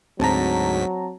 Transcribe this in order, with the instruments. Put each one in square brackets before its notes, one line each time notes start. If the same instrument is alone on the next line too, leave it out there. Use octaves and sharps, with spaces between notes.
[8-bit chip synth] D2 G#2 B6 [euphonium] F#3 [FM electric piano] C4 A5 A#5